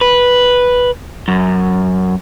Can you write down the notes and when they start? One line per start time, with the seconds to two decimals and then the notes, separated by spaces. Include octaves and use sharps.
0.01 B4
1.28 F#2